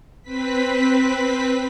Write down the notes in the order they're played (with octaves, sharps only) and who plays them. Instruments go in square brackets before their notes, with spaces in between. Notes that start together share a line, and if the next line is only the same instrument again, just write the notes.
[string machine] C4 B4 B6